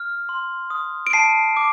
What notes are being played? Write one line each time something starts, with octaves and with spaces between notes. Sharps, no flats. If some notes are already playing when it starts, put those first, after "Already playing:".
Already playing: F6
C6
D#6
D7
A5 C7
D6